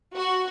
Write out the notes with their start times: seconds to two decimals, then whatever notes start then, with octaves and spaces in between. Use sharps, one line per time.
0.15 F#4